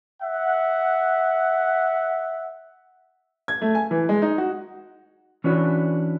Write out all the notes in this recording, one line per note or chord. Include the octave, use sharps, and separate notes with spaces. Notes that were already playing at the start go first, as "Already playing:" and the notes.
E5 F#5
G#6
A3
G#5
E3
G#3
D#4
F#4
E3 C#4 D4 F#4 B4